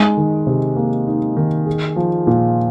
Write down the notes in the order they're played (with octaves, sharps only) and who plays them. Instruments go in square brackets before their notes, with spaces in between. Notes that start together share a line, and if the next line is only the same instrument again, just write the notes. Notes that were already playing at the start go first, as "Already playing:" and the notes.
Already playing: [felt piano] G#3 [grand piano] D#4
[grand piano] D#3
C3
A#3
D#4
D#3
G#4
F3
A#2